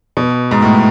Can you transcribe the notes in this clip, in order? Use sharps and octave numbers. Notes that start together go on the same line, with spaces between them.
B2
G#2
A2